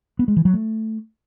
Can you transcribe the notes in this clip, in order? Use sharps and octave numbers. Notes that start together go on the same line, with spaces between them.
B3
G#3
E3
F#3
A3